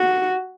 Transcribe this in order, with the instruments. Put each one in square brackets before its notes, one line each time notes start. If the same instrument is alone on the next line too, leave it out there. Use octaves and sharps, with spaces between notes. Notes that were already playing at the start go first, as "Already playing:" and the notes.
Already playing: [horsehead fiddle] F#4